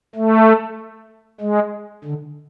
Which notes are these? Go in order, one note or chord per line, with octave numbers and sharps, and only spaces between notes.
A3
G#3
D3